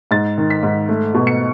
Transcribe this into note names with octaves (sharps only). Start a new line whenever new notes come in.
G#2 A6
D#3
B6
G#2
A3
B2
C#7